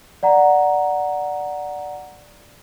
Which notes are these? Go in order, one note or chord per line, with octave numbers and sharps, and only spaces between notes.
D5 F#5 A#5